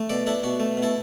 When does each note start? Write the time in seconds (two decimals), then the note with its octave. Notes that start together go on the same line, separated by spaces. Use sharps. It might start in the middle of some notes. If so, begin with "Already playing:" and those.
Already playing: A3
0.10 B2 A4 D5
0.26 D4 E4 A4
0.43 B2 F#4
0.60 A3
0.77 B2
0.82 E4 A4